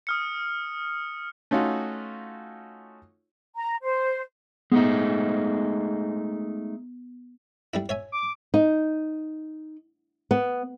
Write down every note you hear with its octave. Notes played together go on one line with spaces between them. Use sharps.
D#6 F6 C#7
A3 C#4 D#4 F4 F#4
A#5
C5
G#3 A3 B3 D#4
G3 D4 E4
C#5 E5 G#5
D6
D#4
B3